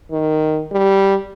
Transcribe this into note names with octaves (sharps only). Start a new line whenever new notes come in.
D#3
G3